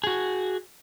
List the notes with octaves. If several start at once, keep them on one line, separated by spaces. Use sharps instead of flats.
F#4 G#4